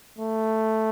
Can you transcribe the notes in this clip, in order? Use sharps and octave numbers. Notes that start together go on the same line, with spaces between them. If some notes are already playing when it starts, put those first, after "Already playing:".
A3